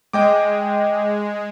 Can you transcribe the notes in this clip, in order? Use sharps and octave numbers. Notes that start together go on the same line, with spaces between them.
G#3 D#5 G5 D6